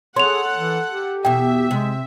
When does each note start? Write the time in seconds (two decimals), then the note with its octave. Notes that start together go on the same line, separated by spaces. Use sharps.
0.16 G#4 A4 C#5 F#5 C6 F7
0.57 E3
0.89 G4
1.25 E2 B2 E5 G5
1.71 C3 G#3